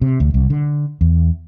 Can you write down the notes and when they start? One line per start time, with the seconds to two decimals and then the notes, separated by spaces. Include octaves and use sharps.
0.01 C3
0.20 D2
0.34 C2
0.50 D3
1.01 E2